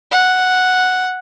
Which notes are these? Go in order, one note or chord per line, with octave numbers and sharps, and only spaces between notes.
F#5